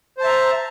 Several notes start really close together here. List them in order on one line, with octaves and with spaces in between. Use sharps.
C5 A5 E5 A#5